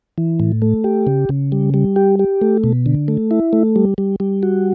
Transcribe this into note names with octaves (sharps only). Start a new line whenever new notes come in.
E3
A2
A3
G4
C#3
C#3
G3
G3
G4
G4
A3
B2
D3
A3
E4
A3
G3
G3
G3
F#4